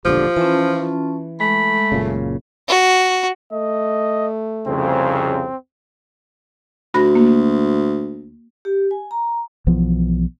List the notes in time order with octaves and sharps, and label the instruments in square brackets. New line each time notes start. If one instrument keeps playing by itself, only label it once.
[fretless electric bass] E1 A#1 D3 [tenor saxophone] F3 [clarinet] G4
[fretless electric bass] E3 [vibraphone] C#4 A5 [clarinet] F4
[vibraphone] G#3 [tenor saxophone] A3 [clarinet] B5
[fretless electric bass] F#1 A#2 C#3
[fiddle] F#4
[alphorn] A3 [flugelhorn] D#5
[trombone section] C2 F2 C#3 [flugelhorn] C4
[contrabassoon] D2 [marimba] F#4 B5 A#6
[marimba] A#3
[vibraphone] G4
G#5
A#5
[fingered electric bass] B1 E3 F3 B3